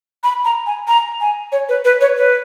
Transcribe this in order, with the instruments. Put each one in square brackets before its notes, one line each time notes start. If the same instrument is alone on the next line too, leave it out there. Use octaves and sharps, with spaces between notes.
[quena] B5
A#5
G#5
A#5
G#5
C#5
B4
B4
C#5
B4